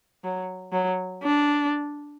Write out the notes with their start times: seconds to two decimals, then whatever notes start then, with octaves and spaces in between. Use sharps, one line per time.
0.24 F#3
0.73 F#3
1.23 D4